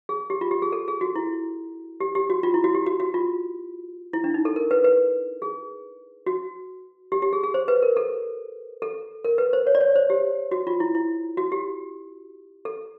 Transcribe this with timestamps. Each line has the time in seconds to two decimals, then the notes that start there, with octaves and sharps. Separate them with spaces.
0.09 G#4
0.30 G4
0.41 F4
0.51 G4
0.62 G#4
0.72 A4
0.88 G#4
1.01 F#4
1.15 E4
2.00 G4
2.15 G4
2.30 F#4
2.43 F4
2.54 E4
2.64 F#4
2.75 G4
2.86 F#4
3.00 F#4
3.14 F4
4.13 E4
4.24 D4
4.34 D#4
4.45 A4
4.56 A#4
4.71 B4
4.84 B4
5.42 G#4
6.26 F#4
7.12 G4
7.22 G4
7.33 G#4
7.43 G#4
7.54 C5
7.68 B4
7.82 A#4
7.97 A4
8.82 A4
9.25 A#4
9.38 B4
9.53 C5
9.67 C#5
9.75 D5
9.81 C#5
9.95 C5
10.10 G4
10.51 F#4
10.67 F4
10.80 E4
10.95 E4
11.37 F#4
11.52 G4
12.65 A4